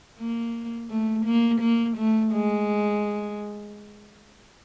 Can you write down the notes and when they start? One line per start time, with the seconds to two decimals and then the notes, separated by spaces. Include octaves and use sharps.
0.19 A#3
0.90 A3
1.26 A#3
1.61 A#3
1.97 A3
2.32 G#3